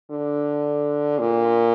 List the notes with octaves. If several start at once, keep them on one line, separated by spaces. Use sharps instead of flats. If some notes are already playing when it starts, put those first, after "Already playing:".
D3
A#2